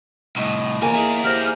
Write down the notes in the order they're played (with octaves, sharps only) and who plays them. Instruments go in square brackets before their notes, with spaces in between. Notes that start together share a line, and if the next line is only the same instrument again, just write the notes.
[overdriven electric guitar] C2 A2 [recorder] D#5
[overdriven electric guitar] E2 G#5 [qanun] A#3 C#5
[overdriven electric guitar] E4 G#4 [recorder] D#5
[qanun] G4 C5 A#5 [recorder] F6